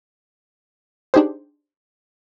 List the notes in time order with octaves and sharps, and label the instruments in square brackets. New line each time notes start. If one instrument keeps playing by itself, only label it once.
[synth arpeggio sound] D4 D#4 G4 G#4 C5